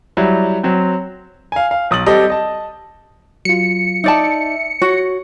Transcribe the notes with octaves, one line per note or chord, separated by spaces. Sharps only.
F#3 G3 E4
F#3 C4
F5 G#5
F5
B1 D#6 A6 F#7
G3 C4 G4 A4 D#5
D#5 A5
F#3 F4 C#7
D#4 D5 E5 A5
F#4 C#5